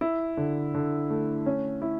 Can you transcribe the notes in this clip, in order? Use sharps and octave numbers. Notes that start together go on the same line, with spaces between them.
E4
D3
D3
A3
C#4
E4